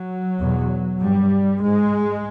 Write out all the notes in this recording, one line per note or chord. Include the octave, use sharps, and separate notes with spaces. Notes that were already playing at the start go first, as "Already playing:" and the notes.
Already playing: F#3
E2 B2
G2 G3
G#2 G#3